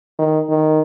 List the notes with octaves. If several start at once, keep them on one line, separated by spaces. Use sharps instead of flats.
D#3
D#3